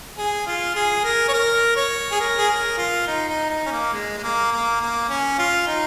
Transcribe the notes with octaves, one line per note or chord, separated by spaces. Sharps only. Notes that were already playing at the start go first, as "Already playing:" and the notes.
G#4
F4
G#4
A#4
C#5
A#4
C#5
G#4
A#4
G#4
A#4
F4
D#4
D#4
D#4
C#4
A#3
G#3
G#3
A#3
A#3
A#3
C#4
F4
D#4